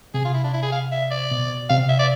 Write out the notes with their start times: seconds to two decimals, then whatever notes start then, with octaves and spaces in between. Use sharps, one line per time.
0.14 C3 G#4
0.25 F4
0.34 E4
0.44 D4
0.54 E4
0.63 G#4
0.72 F5
0.92 E5
1.11 D5
1.31 B2
1.70 C3 F5
1.89 E5
1.99 D5